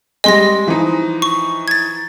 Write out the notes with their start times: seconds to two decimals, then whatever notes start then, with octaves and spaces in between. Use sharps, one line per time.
0.24 G3 G#3 G#4 D#5 C6 A#6
0.67 E3 F3 D#4
1.22 C#6
1.68 G#6 A6